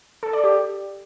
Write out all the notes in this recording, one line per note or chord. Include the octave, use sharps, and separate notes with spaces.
A4
D5
G4